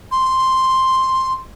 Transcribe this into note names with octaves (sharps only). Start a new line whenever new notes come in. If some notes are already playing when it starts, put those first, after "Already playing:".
C6